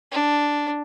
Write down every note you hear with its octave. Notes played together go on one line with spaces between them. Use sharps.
D4